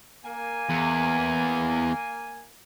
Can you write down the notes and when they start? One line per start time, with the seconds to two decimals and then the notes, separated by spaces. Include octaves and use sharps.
0.25 A#3 G#5
0.69 E2